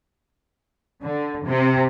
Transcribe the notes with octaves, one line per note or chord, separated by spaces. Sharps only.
D3
C3